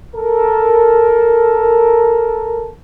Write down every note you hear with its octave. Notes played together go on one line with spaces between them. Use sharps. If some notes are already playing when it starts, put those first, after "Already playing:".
A4 A#4